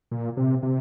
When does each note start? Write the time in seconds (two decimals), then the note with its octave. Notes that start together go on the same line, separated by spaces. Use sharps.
0.12 A#2
0.37 C3
0.63 C3